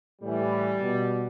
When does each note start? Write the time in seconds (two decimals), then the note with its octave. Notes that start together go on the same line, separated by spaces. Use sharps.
0.21 A2 E3 G3
0.81 B2